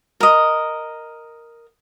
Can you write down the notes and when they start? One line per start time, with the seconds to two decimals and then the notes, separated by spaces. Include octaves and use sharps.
0.20 A#4 D#5